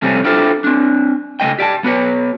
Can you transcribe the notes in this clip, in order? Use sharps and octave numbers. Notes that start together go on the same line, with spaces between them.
F2 C3 G3 A3 C4 C#4
D4 E4 F4 G4 A4 C5
C4 D4
C#3 A3 D#5 G5
G4 D5 F5 A5
B3 F#4 B4 C#5